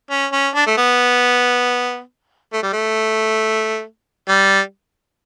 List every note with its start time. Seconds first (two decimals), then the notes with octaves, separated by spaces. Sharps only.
0.11 C#4
0.33 C#4
0.55 D4
0.67 A3
0.77 B3
2.54 A3
2.63 G3
2.73 A3
4.29 G3